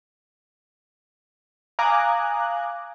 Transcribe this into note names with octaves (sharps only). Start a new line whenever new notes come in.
F5 G#5 A#5 D6 D#6 F#6